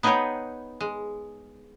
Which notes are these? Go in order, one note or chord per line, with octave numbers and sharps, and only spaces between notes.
B3 D#4 G#4 B4 C#5 G5
G#3